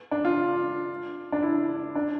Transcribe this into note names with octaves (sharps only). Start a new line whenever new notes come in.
D4
F4
D4
E4
D4